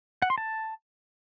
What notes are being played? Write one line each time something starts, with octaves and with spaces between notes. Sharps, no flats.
F#5
C6
A5